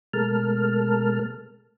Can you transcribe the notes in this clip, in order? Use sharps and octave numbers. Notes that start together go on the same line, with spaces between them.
B2 G#3 A3 A#4 A5 F6